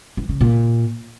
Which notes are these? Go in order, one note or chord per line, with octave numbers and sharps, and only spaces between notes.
E3
C#3
A#2